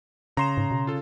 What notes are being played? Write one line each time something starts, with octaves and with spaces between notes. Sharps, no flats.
C#3 A#5 C6 E7
G#2
B2
F4 A4